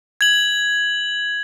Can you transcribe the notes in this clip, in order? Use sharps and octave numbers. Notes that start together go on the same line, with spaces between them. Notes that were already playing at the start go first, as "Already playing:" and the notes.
G#6 F#7